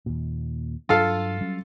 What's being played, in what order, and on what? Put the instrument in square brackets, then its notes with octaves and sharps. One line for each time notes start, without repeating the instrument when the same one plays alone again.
[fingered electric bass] D#2 A#2
[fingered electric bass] G2 F#3 D4 [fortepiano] F4 A4 F5
[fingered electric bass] F#3 G3 C#4